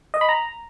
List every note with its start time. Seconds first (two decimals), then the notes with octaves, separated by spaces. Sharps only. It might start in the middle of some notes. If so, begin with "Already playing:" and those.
0.14 D#5
0.21 B5
0.29 A#5